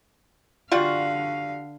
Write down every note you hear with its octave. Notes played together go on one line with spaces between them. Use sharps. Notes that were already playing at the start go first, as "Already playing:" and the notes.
D3 G3 F4 F#4 F5